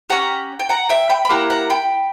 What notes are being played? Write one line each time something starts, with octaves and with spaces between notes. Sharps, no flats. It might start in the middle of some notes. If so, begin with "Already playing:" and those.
C#4 G4 F#5 A#5
G5
F#5 A#5
E5 G5
G5 B5
B5
A#3 E4 G4 F#5 A#5
F#5 A#5
G5 B5